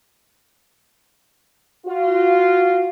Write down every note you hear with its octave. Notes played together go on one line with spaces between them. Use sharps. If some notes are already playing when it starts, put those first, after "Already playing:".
F4 F#4